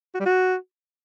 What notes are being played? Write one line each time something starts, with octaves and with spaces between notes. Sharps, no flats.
F#4
G3
F#4